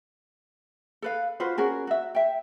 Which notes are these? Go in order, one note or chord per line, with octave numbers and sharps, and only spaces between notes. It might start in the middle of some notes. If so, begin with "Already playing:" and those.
A4 B4 F5
F4 F#4 B4 C5
C#4 F#4 G#4 A#4
F#4 E5
E5 G5